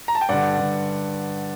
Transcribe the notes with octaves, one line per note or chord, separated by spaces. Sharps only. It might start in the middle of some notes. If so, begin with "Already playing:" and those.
A#5
A5
G5
G2 D3 D5 F#5
G2 D3